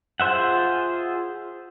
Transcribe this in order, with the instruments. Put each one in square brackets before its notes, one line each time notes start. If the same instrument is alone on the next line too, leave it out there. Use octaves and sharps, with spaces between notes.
[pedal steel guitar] F4 G#4 C5 E5 F#5